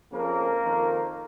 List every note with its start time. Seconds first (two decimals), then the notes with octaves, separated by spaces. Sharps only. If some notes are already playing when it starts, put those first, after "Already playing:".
0.12 F2 C#3 F3 A#3 A#4
0.61 F2 D#3